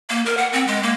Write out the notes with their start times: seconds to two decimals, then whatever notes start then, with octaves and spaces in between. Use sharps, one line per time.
0.10 A#3
0.26 A#4
0.37 F#5
0.53 C4
0.67 G#3
0.83 A#3